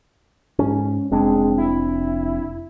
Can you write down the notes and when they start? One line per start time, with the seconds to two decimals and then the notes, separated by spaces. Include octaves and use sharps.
0.59 G#2 C#4
1.11 F1 G#3 C4 D4
1.58 E4